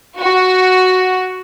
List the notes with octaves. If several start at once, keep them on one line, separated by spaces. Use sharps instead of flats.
F#4